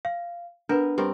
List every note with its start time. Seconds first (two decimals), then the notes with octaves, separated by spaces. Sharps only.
0.05 F5
0.69 B3 D4 A#4 B4
0.98 G2 C4 A#4